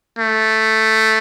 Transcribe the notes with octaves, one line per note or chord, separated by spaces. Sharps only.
A3